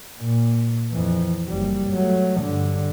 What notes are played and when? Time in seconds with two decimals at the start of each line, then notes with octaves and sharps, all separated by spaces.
0.20 A#2
0.91 F2 E3
1.48 F#1 G3
1.90 F#3 A3
2.41 G2 D3